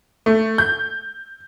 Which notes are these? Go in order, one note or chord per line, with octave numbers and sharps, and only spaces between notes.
A3
G6